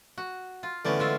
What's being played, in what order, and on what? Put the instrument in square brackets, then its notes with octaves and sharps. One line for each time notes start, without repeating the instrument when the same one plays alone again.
[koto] F#4
F4
[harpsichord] D3 E3 A3 [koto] B3 C#4 D5
[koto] G#3 F4 E5